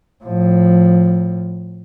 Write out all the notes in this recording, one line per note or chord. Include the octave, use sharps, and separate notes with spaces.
A2 F3